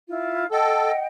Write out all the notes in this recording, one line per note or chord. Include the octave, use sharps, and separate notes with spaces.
E4 F4
A4 D#5 F#5 G5